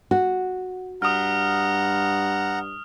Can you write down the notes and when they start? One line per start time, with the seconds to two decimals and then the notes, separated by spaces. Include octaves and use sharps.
0.11 F#4
1.02 G2 F#5 A#5 D#6 F6